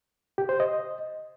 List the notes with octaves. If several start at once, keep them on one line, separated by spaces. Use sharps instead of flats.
G4
C5
D#5